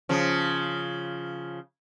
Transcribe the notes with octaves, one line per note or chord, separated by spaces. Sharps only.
C#3 F3